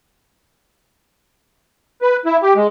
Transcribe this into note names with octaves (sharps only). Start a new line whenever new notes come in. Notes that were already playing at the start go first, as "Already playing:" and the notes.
B4
E4
G4
G#3